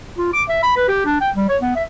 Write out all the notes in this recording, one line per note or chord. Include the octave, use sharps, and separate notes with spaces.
F4
D6
E5
B5
B4
G4
D4
G5
G3
C#5
B3
E5